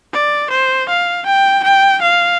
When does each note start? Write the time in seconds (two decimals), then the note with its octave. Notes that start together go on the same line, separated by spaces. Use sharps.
0.13 D5
0.51 C5
0.89 F5
1.26 G5
1.64 G5
2.02 F5